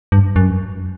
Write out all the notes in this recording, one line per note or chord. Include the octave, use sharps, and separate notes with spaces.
G2
F#2